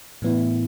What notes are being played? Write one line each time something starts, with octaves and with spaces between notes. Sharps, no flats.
A2 E3 B3 E4